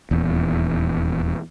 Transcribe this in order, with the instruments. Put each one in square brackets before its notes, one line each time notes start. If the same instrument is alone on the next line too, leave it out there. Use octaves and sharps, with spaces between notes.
[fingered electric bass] D#1 E2